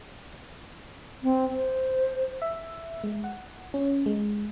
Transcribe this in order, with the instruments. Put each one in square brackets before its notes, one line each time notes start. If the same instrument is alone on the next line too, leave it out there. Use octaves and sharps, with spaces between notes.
[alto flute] C4
C5
[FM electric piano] E5
G#3
F#5
C#4
G#3